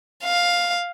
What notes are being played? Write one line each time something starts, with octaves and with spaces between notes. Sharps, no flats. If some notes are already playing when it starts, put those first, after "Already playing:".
F5